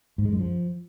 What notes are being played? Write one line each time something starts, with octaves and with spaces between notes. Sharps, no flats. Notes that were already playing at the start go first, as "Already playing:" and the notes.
G#2
G#3
F#2
F3